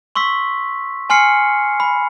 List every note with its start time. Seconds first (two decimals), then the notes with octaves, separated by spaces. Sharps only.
0.15 C6 C#6 E6 B6
1.10 G#5 C6 F6 C7 C#7
1.80 B5